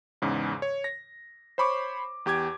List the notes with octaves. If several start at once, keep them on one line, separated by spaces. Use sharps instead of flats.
E2 G#2 C#3
C#5
A#6
C5 C#5 B5 C#6 D6
E2 G4 D6 G#6